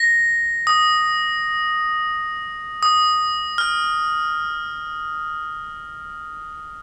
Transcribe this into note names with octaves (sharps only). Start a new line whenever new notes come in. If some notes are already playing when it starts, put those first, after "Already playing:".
Already playing: A#6
D#6
D#6
F6